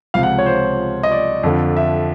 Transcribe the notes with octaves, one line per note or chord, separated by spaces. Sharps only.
C#2 C3 F3 F5
F#5
C#5
C5
D#5
D5
F2 D3 F3
E5